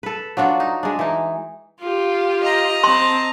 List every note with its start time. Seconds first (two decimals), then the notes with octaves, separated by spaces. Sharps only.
0.03 A4 B4
0.37 F#3 D4 F4 F#4
0.60 D#4
0.83 G#3 D4
0.99 E3 D#4
1.80 F4 G4
2.42 D#5 A#5
2.84 C4 A5 C6